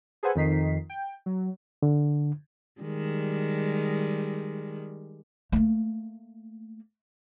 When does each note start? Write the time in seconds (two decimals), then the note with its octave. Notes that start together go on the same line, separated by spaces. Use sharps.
0.23 G#4 A4 B4 C5 F#5 G#5
0.35 F2 D#3 D#4 B6 C7
0.90 G5
1.26 F#3
1.83 D3
2.81 D#3 G3 G#3
5.52 A3 A#3